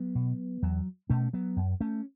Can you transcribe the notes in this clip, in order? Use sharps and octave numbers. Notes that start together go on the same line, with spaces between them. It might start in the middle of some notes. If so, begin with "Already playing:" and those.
Already playing: F#3 B3
B2
E2 F#3
B2 A3 C#4
F#3 B3
F#2
A3 C#4